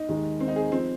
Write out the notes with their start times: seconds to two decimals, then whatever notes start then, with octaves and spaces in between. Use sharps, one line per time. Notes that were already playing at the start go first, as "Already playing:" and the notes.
Already playing: D#4
0.08 D#2 D#3 G#3
0.40 C4
0.48 D#4
0.56 G#4
0.72 F3 C4